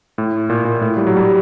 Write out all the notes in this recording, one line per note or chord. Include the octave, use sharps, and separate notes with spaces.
A2
A#2
A#2
A2
G3
F#3
G3